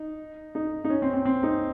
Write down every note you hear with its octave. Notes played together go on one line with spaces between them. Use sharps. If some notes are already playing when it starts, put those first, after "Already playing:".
Already playing: D#4
D#4
D#4
C#4
C4
C4
C4
D#4